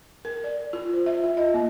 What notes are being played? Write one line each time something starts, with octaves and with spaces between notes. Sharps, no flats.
A#4
D5
F4
C5
E5
F4
D#5
A#3